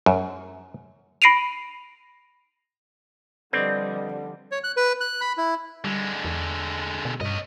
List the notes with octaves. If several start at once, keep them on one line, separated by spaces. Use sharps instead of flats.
F#2
B5 A#6 C7 D7 D#7 F7
D3 F3 G3 C4 B4 D5 D#5
C#5
F#6
B4
F#6
B5
E4
D3 G3 G#3
E2
B2
G2 C#4 D#5